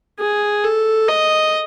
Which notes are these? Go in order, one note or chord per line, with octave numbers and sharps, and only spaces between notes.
G#4
A4
D#5